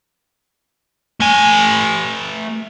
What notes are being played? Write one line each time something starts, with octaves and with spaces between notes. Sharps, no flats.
A3 G#5